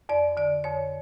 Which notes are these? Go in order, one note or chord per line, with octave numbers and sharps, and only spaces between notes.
F2 D5
D3 D5
F2 C#5